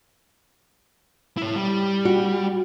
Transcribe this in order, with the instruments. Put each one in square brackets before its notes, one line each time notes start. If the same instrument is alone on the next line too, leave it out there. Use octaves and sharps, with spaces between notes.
[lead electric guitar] E4 C#5
G3
[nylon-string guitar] F#4